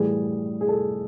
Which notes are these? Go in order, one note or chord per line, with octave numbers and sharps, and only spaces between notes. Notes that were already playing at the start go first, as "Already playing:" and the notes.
Already playing: A2 E3 G3 G#4
G#4
A4